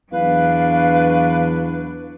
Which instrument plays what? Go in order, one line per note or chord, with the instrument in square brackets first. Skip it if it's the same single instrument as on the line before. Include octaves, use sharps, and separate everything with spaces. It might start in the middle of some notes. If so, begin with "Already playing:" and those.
[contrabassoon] E2 [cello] F#3 D4 [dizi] B4 [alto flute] F5